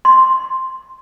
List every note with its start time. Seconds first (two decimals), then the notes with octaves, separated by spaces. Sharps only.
0.05 C6